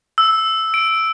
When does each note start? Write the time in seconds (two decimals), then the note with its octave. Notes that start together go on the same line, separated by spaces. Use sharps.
0.18 E6
0.74 D7